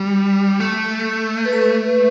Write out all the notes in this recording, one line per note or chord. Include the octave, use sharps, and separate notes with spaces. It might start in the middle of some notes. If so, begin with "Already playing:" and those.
Already playing: G3
A3
B4
A4
B4